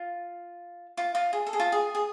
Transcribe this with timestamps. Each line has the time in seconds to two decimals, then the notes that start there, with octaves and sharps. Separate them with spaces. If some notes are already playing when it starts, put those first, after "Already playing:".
Already playing: F4
0.97 F4
1.15 F4
1.33 G#4
1.46 A4
1.53 G#4
1.59 F4
1.72 G#4
1.95 G#4